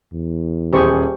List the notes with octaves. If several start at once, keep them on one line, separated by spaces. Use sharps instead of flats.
E2
D#1 G4 G#4 C5 C#6 D#6